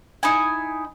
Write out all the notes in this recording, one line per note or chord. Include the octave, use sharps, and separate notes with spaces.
D#4 E4 G#5